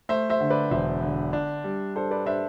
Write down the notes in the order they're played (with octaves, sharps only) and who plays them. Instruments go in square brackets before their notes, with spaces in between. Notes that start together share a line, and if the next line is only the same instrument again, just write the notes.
[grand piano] A3 [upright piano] C5 E5
[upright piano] C5 E5
[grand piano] D3
[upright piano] B4 D5
[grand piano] E1 [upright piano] C5 E5
[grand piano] D3
D4
G3
[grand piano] D4 [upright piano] A4 C5
[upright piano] B4 D5
[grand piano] D4 [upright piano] C5 E5